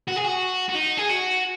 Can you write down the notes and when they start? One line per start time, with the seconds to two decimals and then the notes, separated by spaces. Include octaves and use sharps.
0.08 F#4
0.17 G#4
0.25 F#4
0.69 F#4
0.75 D#4
0.98 G#4
1.09 F#4